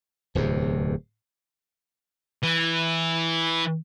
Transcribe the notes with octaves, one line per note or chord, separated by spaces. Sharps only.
D1 E2 C3
E3